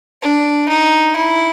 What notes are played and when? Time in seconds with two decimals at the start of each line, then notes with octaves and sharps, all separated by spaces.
0.22 D4
0.69 D#4
1.16 E4